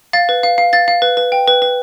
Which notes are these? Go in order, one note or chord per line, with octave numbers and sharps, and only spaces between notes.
F5 A6
B4
F5
F5
F5 A6
F5
B4
B4
G5
B4
B4